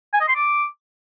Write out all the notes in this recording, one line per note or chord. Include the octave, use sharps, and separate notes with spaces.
G#5
D#5
C6
D6